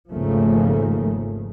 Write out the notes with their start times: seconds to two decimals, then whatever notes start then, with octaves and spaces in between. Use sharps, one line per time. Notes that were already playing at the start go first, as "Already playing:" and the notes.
0.11 G#1 D#2 C#3 F3 A3 A#3